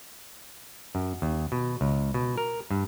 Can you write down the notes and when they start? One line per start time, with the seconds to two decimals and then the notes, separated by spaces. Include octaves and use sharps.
0.95 F#2
1.22 D#2
1.52 B2
1.81 C#2
2.14 B2
2.38 A#4
2.71 G2